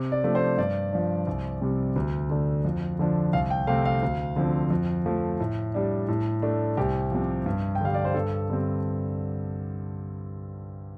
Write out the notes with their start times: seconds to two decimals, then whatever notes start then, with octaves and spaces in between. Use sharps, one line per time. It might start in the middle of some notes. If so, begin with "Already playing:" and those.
Already playing: C3
0.12 D5
0.24 F3 A3 D4
0.35 C5
0.57 G2 D5
0.93 F3 D4
1.27 C2
1.61 C3 G3 C4
1.96 D2
2.30 D3 A3 D4
2.65 F2
2.99 D3 F3 D4
3.33 C2 F5
3.50 G5
3.67 C3 A3 C4 F5
3.85 F5
4.03 D2
4.36 D3 F3 C4
4.70 F2
5.06 F3 A3
5.40 A2
5.74 G3 D4
6.08 A2
6.42 A3 D4
6.77 C2 G4
7.11 C3 F3
7.46 G2
7.75 G5
7.81 D3 G3 F5
7.94 D5
8.05 C5
8.15 G2 A4
8.50 D3 G3 C4